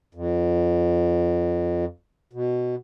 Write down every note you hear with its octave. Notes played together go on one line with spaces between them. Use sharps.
F2
B2